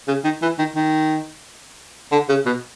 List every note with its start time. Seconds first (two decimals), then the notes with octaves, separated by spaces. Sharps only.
0.08 C#3
0.24 D#3
0.42 E3
0.58 D#3
0.75 D#3
2.12 D3
2.29 C#3
2.46 B2